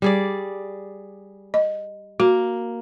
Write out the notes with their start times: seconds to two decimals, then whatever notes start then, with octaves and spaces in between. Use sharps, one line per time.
0.02 G3 G#4 D5
1.54 D#5
2.20 A#3 F#4